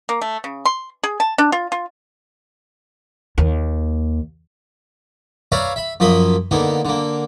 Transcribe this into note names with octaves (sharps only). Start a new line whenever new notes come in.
A#3
A3
C#3
C6
G#4
A5
D4
F4
F4
D#2
B4 C#5 D5 E5 F5 A#5
E5 B5
F#2 F3 A#3 D#5 B5
D3 A#3 B3 D#4
D3 A#3